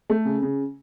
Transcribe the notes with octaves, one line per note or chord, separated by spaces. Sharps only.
A3
C#3
C#3